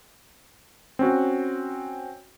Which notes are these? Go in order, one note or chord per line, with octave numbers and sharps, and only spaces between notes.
C4 C#4 F#4